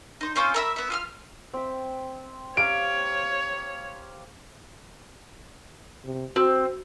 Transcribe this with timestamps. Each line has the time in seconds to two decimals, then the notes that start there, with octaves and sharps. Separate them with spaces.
0.21 D#4 C5
0.36 C4 C#4 F4 C5
0.54 A#4 E5 B5
0.76 B3 E5
0.90 F4 D#6 F6
1.54 C4 E5
2.57 G4 C#5 F5 A#5 D7
6.05 C3
6.36 C4 F#4 C5